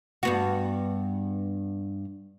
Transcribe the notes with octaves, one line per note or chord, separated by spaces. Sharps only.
G2 B3 F#4